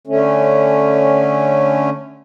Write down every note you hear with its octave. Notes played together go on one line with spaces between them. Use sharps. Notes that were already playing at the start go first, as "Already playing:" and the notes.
D3 A3 C#4